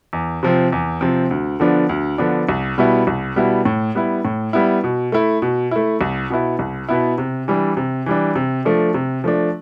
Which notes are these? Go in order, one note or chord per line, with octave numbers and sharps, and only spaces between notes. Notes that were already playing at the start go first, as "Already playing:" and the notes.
E2
C3 F3 C4
E2
C3 F3 C4
D2
D3 F3 B3 D4
D2
D3 F3 B3 D4
C2
B2 G3 B3 E4
C2
B2 G3 B3 E4
A2
G3 B3 E4
A2
G3 B3 E4
B2
A3 E4
B2
A3 E4
C2
B2 B3 E4
C2
B2 B3 E4
C3
E3 G3 D4
C3
E3 G3 D4
C3
F3 A3 D4
C3
F3 A3 D4